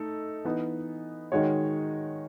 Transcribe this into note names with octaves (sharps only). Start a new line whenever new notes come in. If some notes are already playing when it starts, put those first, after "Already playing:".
Already playing: A3 D#4 A4
E3 B3 D#4
D#3 G#3 D#4 F#4 C#5